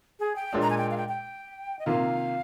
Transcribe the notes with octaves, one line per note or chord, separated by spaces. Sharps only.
G#4
G5
A#2 G#3 D4
A#5
G#5
G5
F5
G5
G5
D#5
C3 D#3 A#3 F4 F5